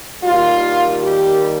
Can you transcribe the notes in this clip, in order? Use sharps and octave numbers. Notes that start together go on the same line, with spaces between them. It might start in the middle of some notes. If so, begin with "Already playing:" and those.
D#2 D#3 G3 F4
G4